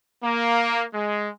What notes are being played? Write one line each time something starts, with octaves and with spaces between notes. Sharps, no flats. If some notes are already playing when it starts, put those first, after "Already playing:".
A#3
G#3